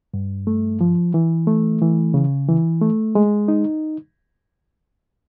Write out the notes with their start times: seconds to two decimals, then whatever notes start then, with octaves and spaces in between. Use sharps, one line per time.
0.14 G2
0.47 A3
0.81 F3
1.14 E3
1.47 A3
1.82 E3
2.14 C#3
2.49 E3
2.81 A3
3.15 G#3
3.48 D#4